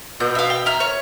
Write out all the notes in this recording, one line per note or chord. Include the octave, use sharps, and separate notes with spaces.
B2 G6
E5 F5
G5
E5 A#5 F6
C#5